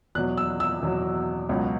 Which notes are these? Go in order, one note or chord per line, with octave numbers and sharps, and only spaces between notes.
E2 B2 F#3 F#6
E6
E6
E2 B2 F#3
C#2 B2 F#3